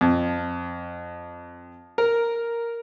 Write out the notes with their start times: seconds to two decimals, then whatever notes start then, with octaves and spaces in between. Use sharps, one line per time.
0.01 F2
1.98 A#4